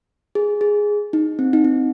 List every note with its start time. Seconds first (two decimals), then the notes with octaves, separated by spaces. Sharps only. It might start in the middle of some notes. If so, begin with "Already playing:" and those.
0.35 G#4
0.61 G#4
1.13 D#4
1.39 C4
1.53 D#4
1.64 C4